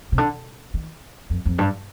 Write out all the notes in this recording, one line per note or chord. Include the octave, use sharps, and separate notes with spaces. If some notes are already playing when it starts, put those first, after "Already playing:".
C3
D3
D#3
F2
F2
G2